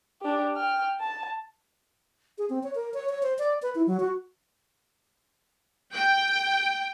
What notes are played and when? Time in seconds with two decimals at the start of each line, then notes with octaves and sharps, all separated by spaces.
0.21 D4 G4
0.56 G5 F6
1.00 A5
2.38 G#4
2.50 C4
2.63 C#5
2.75 A#4
2.94 C#5
3.09 C#5
3.23 C5
3.39 D5
3.62 B4
3.75 E4
3.87 F#3
4.00 F#4
5.94 G5